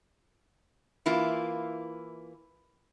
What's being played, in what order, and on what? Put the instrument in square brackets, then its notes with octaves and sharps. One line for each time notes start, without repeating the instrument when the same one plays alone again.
[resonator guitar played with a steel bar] E3 A#3 E4 F4